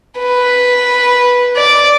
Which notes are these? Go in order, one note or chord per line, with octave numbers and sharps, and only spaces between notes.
B4
D5